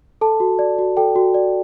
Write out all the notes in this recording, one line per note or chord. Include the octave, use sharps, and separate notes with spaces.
A4 A5
F#4
D5
F#4
A4 G5
F#4
D5